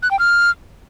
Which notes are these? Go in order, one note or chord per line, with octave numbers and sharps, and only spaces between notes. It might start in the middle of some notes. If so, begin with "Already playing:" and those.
F#6
G5
F6